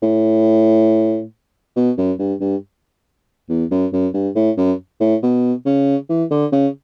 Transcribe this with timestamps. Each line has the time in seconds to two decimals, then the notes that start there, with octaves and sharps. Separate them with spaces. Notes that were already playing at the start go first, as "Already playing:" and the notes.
0.02 A2
1.76 B2
1.97 F#2
2.19 G2
2.41 G2
3.49 E2
3.71 F#2
3.93 F#2
4.14 G2
4.35 A2
4.57 F#2
5.00 A2
5.23 B2
5.66 C#3
6.09 E3
6.31 D3
6.52 C#3